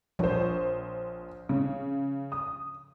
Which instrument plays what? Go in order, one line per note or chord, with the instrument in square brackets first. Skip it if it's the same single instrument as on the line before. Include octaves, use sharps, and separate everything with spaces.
[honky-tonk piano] A#1 C5 [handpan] F3 C#5
[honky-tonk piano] C#3
D#6